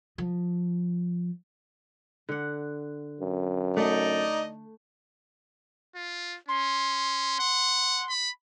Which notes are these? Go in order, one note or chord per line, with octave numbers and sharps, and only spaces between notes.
F3
D3 F#5
F#2
A3 D#4 D5 D#5
F4
C#4 C6
F#5
B5